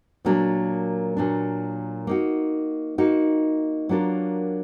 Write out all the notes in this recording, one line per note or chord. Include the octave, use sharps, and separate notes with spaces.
A#2 F#3 A#3 D4
A#2 F#3 A#3 D4
A#3 D#4 F#4
A#3 D#4 F#4
F#3 A#3 D4 F4 A#4